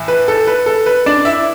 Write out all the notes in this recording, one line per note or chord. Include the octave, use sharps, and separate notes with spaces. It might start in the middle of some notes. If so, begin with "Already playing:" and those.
Already playing: A2 E3
B4
A4
B4
A4
B4
D4 D5
E4 E5